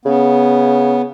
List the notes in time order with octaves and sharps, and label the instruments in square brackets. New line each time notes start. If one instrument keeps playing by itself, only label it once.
[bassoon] C#3 [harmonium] B3